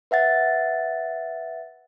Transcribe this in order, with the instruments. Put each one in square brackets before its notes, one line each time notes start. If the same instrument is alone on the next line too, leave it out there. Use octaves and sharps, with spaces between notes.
[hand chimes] B4 E5 F#5 A6